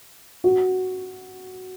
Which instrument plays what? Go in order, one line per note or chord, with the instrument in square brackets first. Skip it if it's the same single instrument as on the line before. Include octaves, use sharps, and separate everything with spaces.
[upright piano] F#4